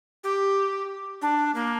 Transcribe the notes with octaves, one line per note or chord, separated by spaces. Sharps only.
G4
D4
A#3